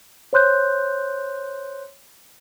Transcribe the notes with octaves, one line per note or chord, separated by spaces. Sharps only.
C5 C#5 C6 F#6 G6